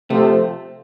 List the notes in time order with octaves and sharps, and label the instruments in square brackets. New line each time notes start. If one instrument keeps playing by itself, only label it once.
[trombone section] C3 F3 C4 F4 [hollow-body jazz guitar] A3